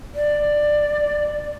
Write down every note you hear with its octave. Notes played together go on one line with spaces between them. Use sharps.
D5